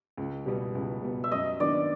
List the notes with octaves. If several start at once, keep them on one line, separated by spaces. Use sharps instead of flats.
C#2
B2 G3 B3
C#2
B2 G3 B3
E5
F#2 D#5
D#3 F#3 B3 D4 D5